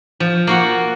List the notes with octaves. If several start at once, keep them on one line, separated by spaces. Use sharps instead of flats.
F3
A#3 F#4 F#5